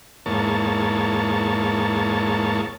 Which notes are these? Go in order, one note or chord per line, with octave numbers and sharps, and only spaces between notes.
E2 G#2 A#3 C#5 A5